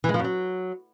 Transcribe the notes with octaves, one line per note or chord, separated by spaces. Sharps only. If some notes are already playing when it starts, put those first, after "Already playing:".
E3
G#3
F3
F#2
F#3